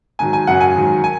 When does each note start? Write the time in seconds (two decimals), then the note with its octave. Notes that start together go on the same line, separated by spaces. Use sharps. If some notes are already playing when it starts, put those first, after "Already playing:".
0.19 G#2 D#3 F#3 G#5
0.33 G#5
0.47 F#2 C#3 F#3 F#5
0.61 G#5
0.75 G#2 D#3 F#3
1.04 G#5